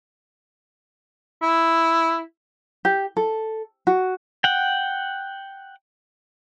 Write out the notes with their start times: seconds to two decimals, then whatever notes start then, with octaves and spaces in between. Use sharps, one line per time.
1.42 E4
2.85 G4
3.17 A4
3.87 F#4
4.44 F#5 G5